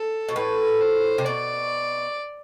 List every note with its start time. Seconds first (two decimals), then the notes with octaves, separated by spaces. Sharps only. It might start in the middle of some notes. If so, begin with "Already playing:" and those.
Already playing: A4
0.29 B2
0.36 A2 B4
0.81 C5
1.18 C3
1.25 B2 D5